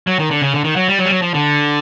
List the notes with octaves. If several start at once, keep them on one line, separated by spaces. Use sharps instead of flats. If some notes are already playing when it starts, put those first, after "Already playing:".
F#3
D#3
D3
C#3
D3
D#3
F#3
G3
F#3
G3
F#3
F3
D3